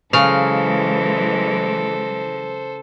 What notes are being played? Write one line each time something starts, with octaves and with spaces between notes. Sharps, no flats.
C#3 E3 F#3 G#3 A4 C5 F5